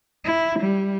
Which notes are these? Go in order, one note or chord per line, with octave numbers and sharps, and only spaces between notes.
E4
G3